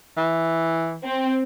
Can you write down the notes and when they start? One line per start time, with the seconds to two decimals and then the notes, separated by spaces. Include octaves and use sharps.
0.17 E3
1.04 C4